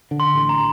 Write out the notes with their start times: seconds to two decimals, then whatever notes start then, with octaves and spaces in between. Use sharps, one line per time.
0.11 D3
0.20 C6
0.34 A1
0.49 A#5